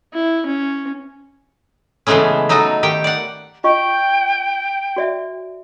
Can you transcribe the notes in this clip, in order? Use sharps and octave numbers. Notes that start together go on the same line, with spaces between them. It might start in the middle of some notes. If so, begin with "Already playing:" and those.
E4
C#4
C#3 E3 G#3 A3 B3 C#4
F#3 D#4 F#4 A4 D#5
D#3 G4 G5
D5 F#5
F4 D#5 G5 C#6
F#4 D5 E5